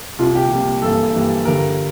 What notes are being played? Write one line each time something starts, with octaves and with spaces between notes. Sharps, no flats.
C2 A#2 G3 A#3 F4
G4
C2 A#2 G3 A#3
G2 E3 G3 A#3 A4
G2 E3 G3 A#3
G2 D3 G3 A#4